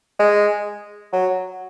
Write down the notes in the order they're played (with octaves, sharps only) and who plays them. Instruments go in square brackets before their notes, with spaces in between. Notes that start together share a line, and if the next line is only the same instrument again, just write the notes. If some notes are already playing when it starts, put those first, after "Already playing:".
[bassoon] G#3
F#3